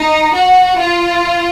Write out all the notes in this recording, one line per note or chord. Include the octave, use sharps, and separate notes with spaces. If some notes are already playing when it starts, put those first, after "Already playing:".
Already playing: D#4
F#4
F4